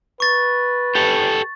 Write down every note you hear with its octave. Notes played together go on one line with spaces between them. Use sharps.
B4 C#6 A6
G4 A4